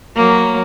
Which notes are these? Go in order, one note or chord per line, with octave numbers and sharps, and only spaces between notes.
F#3 A#3